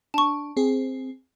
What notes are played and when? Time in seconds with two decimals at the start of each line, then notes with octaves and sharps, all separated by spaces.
0.14 D4 A5 C#6
0.57 C4 G#4